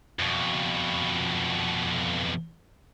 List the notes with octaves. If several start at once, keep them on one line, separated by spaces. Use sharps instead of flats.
F2 B2